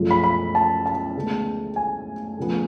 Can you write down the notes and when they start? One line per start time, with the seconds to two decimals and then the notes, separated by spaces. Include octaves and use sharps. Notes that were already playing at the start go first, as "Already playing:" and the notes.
Already playing: F#2 C#3 F3 A3
0.11 B5
0.24 B5
0.55 A5
0.86 A5
1.15 D2 C#3 G#3 B3
1.76 G#5
2.37 D2 C#3 F3 B3